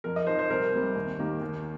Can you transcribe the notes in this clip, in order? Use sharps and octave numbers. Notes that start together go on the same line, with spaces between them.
F2 A#4
D#5
F3 D#4 C5
C5
C2 A#4
C3 G3 C4
D#2
D#3 A#3 G4
D#2